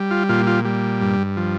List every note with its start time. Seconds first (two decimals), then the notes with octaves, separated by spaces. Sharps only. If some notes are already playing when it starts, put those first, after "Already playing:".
Already playing: G3
0.11 F4
0.29 A#2 F4
0.47 F4
0.65 G3
1.01 G2
1.37 F3